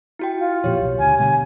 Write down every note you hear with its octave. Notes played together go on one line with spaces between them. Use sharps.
E4 F#4 G5
F4
A#1 F2 A#2 G4 C#5
B1
D2 D3 G#5
B2 D3 G3 G#5